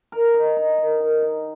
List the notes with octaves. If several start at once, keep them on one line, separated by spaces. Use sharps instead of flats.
A#4
D#4
D#4
A#4
D#3
D#4